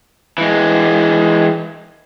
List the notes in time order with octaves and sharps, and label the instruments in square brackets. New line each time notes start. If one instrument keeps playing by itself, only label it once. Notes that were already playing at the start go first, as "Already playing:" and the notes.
[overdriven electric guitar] E3 G#3